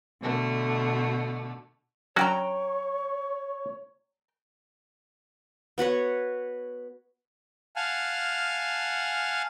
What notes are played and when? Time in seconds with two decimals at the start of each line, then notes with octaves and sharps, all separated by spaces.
0.21 B2 D3 A3
2.16 F#3 C#4 D4 F#4 C#5 G5 A#5 C#6
5.78 B3 F#4 B4 C#5
7.76 F5 F#5 G#5 A5 F6